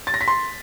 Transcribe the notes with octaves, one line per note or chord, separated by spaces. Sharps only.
A6
A#6
B6
C6